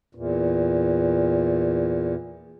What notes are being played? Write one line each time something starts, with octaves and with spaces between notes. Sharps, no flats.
E2 A#2